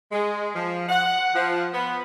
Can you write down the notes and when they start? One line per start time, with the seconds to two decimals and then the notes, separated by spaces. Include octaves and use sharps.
0.12 G#3
0.55 F3
0.89 F#5
1.35 F3
1.74 B3